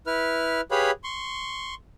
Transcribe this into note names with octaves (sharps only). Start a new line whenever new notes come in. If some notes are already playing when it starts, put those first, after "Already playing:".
E4 B4 F6
G4 G#4 B4 C#5 F5 B5
C6 C#6